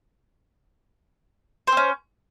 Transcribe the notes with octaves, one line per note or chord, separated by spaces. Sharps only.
C4 C#4 C5